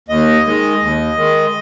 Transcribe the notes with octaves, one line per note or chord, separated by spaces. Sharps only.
D#2 D#5
D#3 G#3
D#2
D#3 G#3